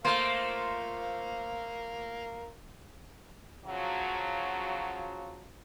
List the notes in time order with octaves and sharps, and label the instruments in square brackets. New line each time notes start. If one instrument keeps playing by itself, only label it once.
[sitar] A3 A#3 [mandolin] F4 C5 [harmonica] A#4 F5
[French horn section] C#3 F3 F#3